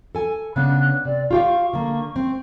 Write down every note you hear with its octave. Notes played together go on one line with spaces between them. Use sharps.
A4 G#5
C#3 B3 D4 F#6
C3 D5
F4 G4 F5 C#6
D3 A#3
C4